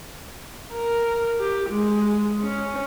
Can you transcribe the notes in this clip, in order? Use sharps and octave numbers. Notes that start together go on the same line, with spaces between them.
A#4
G4
G#3
C#4